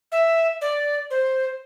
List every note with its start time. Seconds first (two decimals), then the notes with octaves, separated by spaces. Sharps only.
0.12 E5
0.61 D5
1.10 C5